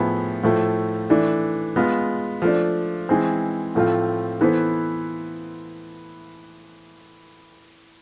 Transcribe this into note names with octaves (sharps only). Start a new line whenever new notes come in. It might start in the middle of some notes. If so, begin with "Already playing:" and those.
Already playing: A2 F3 B3 E4 G#4
A2 F3 A3
E3 A3 D4
G#3 B3 F4
F3 A3 D4
E3 G#3 C4 G#4
A2 F3 A3 C4 F4
E3 B3 E4 A4 C5